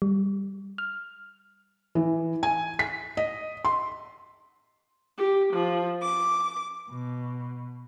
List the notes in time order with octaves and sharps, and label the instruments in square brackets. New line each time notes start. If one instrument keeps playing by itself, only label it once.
[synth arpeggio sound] G3
F6
[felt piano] E3
G#5
B6
D#5
C6
[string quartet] G4
F3
D6
B2